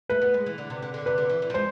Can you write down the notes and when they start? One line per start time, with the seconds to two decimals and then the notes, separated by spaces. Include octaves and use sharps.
0.10 A3 B4
0.22 B3
0.34 G#3
0.46 E3
0.58 D3
0.70 C3
0.82 D3
0.94 D3
1.06 C3 B4
1.18 D3
1.29 E3
1.42 E3
1.50 F3
1.54 G#3 C5